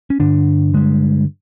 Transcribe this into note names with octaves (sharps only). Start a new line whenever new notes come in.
C#4
G2 D3 D4
G2 D3 G#3